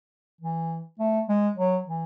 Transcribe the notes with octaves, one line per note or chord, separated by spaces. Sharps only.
E3
A3
G#3
F#3
E3